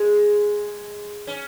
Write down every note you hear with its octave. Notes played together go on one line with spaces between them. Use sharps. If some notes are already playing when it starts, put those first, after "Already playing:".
Already playing: G#3
C#4